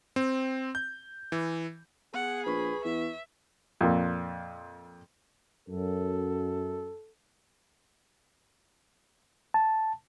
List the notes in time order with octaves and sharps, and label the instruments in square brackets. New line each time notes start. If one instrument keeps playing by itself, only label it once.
[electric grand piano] C4
G6
E3
[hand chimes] B3 [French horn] G#4 [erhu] F#5
[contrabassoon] A#1 [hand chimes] B4 C#6 [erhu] B5
[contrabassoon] E2 [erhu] E5
[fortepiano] F2 A#2
[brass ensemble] F#2 [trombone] A4
[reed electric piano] A5